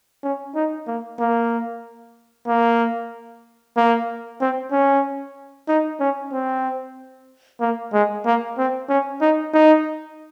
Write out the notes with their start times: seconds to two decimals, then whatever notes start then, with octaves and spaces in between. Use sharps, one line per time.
0.23 C#4
0.55 D#4
0.87 A#3
1.20 A#3
2.48 A#3
3.77 A#3
4.41 C4
4.72 C#4
5.69 D#4
6.00 C#4
6.33 C4
7.61 A#3
7.93 G#3
8.26 A#3
8.58 C4
8.89 C#4
9.21 D#4
9.54 D#4